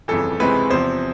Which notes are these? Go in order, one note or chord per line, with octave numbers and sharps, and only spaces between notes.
G1 F2 C#3 E3 A4
C#2 C3 E3 G#3 C4 B4
E2 C3 F3 C5